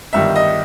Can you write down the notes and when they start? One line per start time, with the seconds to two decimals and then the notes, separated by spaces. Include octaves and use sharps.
0.13 G1 G2 D#3 G3 E5
0.36 D#5